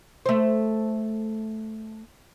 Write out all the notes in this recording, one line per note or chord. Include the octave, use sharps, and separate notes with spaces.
A3 C5